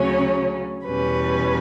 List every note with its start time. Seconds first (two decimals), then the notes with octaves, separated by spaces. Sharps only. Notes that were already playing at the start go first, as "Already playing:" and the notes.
Already playing: D2 C#3 F#3 C#4 C#5
0.85 E2 B2 G3 C#4 B4